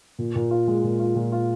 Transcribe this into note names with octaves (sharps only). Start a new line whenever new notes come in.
A#2
A#2
F4
G#3
A#2
F4
A#2
F4